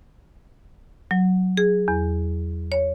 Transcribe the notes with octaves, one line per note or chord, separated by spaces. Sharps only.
F#3
G#4
E2
C#5